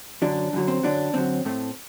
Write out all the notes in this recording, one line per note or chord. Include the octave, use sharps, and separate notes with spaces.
F#2 D3 F#3 D4
F#2 D3 F#3
C4
F#2 D3 F#3 D4
F#2 D3 F#3 C4
A2 A3 C4